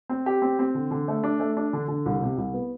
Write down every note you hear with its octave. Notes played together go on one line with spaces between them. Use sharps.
C4
G4
C4
C4
D3
D3
A3
D4
A3
D4
D3
D3
C2
C3
C2
B3